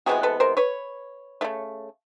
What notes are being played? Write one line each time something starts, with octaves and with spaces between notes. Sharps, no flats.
C3 E3 G#3 B3 F#4 G#4
A4 B4
A#4 C5
B4 C#5
C#3 F3 A3